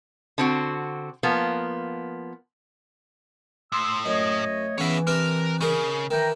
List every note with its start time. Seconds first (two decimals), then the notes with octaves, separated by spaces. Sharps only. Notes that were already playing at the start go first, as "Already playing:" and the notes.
0.38 D3 C4 F#4
1.23 F3 A#3 B3
3.72 A2 C6 E6
4.06 F#2 A3 C#5 D#5
4.78 C#3 E3 B3 E4 C#5 E5
5.07 C3 D4 A#4 B4
5.61 C#3 D#4 G#4 A#4
6.11 D#3 E3 E5 G5 A#5